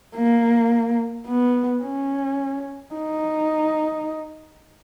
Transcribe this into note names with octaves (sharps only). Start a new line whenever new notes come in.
A#3
B3
C#4
D#4